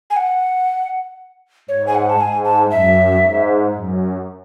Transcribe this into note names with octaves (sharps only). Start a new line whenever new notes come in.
G#5
F#5
G#2 C#5
G#5
F#5
A5
G#2 G#5
A5
F#2 E5
G#2
F#2